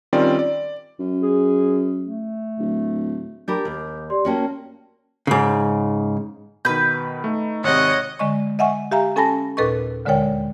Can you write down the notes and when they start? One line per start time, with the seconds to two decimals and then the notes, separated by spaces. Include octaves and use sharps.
0.13 D#3 G3 C4 C#4 F4 D5
0.39 D5
0.99 F#2
1.23 G#4
2.04 A3
2.59 D1
3.48 D4 G4 A#4 B5 D6 G6
3.65 D#2
4.10 G4 D5 C6
4.25 A#3 C#4 F#4 C#5 G5 A5
5.27 G#2 C#3
6.65 B2 D#3 B4 G6
7.24 A3 D#4
7.64 G#1 C3 C#5 D#5 F#5
8.19 D3 G#3 D#5 C#6
8.59 D#5 E5 F#5 G#5 C#6
8.91 G4 E5 F5 G#5 A#5
9.16 C#4 A4 G#5 A5 B5 A#6
9.57 D#2 A#2 A4 B4 D#5 C#6
10.05 D2 D3 G#3 A#4 C#5 G5